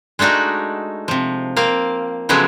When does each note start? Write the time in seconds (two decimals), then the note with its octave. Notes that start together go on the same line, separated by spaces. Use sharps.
0.19 G#3 A3 D4 D#4 F#4
1.08 C3 F3
1.56 A#3 C4 F5
2.29 C#3 F3 F#3 G#3 A3 B3